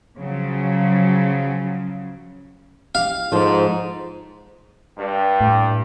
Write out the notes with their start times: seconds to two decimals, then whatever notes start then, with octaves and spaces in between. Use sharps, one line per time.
0.17 C#3 F3 F#3
2.95 G4 F5
3.32 G#2 F3 A4 C5
4.97 G2
5.41 A2